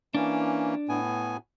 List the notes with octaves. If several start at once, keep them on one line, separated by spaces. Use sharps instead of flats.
E3 A#3 C#4 D4
A2 B3 G#5